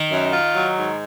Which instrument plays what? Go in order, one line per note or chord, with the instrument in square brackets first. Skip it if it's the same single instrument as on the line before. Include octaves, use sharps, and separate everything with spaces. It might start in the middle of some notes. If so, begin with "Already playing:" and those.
Already playing: [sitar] D#3
[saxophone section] F#2
F4
F#3
G#2